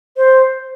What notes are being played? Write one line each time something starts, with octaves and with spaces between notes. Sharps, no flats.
C5